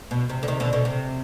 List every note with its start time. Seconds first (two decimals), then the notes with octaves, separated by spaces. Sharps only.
0.11 B2
0.30 C3
0.43 D3
0.48 C3 D#3
0.60 B2 D3
0.73 B2 D3
0.85 C3